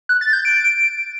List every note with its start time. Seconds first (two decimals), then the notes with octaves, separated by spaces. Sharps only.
0.09 F#6
0.21 A6
0.33 G6
0.45 D7